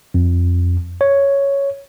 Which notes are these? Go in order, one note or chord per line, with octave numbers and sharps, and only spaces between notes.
F2
C#5